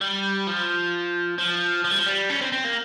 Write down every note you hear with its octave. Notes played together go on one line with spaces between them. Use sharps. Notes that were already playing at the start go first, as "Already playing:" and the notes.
G3
F3
F3
F3
G3
F3
G3
C#4
C4
C4
A#3